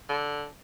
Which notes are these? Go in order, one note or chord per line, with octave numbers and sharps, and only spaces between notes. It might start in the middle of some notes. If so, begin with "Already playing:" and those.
D3